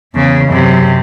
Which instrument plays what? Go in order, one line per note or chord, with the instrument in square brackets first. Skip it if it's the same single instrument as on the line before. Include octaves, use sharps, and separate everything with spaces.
[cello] E2 C#3
F#2 C3